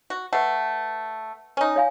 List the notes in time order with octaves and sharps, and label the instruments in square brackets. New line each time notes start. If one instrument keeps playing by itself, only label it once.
[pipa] F#4
[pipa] A3 [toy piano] B4 F#5
[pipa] C#4 D#4
[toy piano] C#5 F5 G#5